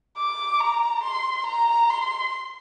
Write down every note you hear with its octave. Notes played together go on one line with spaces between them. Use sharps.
D6
A#5
C6
A#5
C6